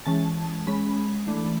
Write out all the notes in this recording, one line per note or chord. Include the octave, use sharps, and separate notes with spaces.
E3 G#3 C#4 A5
G#3 C#4 B5
E3 A3 D4